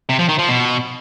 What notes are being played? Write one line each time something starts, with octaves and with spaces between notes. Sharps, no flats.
C3
F3
D#3
F3
B2